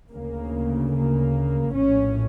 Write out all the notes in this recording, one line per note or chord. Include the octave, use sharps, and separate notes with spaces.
D2 C#3 A#3
A#3
A#1 A2 C#4